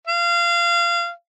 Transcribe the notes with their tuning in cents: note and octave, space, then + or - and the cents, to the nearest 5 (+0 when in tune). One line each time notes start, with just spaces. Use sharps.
F5 -25